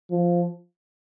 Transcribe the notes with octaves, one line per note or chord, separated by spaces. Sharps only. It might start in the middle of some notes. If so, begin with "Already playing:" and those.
F3